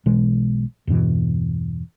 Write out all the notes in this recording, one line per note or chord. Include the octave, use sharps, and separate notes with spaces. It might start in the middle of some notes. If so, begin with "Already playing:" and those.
B1 B2 E3 G#3
E2 G2 B2 E3